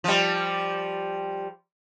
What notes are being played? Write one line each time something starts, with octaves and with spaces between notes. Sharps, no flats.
F3 G3